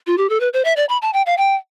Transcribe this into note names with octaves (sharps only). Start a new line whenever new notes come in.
F4
G4
A4
B4
C5
E5
D5
B5
A5
G5
F5
G5